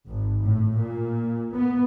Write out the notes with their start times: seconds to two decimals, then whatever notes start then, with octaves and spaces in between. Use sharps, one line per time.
0.10 G#1
0.45 A2
0.79 A#2
1.55 B3